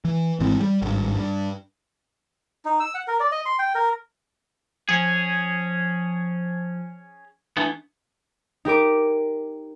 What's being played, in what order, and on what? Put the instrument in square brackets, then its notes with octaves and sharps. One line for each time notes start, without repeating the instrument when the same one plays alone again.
[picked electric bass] E3
G#1 G#2 E3 C4
G3
G#1 G2
G2
[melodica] D#4
E6
F#5
A#4
D5
D#5
C6
G5
A#4
[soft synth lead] F3 [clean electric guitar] C#4 G#4
[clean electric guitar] E3 A3 B3 [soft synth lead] D4
[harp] D#4 G4 A#4 D6